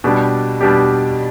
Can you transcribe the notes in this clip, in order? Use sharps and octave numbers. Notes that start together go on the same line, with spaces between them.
B2 G3 D4 G4
B2 G3 D4 G4